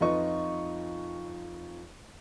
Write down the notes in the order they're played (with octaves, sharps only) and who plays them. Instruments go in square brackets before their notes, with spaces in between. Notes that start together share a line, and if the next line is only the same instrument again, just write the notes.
[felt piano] F2 D#4 F4 B4 D#5 C#6